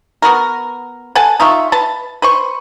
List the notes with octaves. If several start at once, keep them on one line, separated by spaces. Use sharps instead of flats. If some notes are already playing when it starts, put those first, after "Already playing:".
B3 F#4 A#4
A4 F#5 G#5 A5
D#4 F4 E5 C#6
B4 A5
B4 C5 C#6